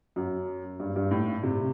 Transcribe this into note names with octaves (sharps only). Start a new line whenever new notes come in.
F#2
G2
G2
A2
C3